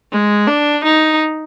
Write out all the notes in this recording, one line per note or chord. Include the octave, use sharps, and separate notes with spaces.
G#3
D4
D#4